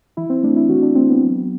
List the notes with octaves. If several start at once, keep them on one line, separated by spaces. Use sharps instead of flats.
E3 E4
C4
A3 D4
E4
E3 F#4
D4
A3 C4
B3
F#3